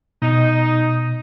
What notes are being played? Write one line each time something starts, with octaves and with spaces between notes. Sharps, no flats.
B2 D#4